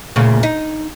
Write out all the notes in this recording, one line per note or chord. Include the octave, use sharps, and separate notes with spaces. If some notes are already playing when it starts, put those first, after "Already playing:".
D2 A#2 C#3
D#4